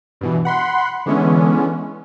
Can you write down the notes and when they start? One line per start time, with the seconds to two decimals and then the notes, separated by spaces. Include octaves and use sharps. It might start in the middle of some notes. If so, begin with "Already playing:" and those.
0.21 G2 B2 E3
0.45 F#5 B5 C6
1.06 D3 E3 G#3 B3 C#4